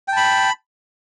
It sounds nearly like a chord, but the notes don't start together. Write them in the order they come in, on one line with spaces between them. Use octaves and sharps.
G5 A5 B5